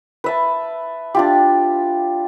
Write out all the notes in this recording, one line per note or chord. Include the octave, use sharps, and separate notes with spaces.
B4 E5 A5
D4 F4 G4